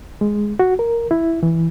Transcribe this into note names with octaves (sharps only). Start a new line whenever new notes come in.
G#3
F#4
A#4
E4
E3